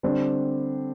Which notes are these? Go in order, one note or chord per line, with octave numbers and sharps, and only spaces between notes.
D3 G3 C4 D4